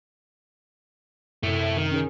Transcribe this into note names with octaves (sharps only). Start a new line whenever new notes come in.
F#2 C3 A3 E4
D#3
C#4 G#4 A#4